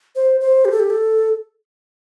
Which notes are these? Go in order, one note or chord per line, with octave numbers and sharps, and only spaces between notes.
C5
C5
G4
A4
G4
A4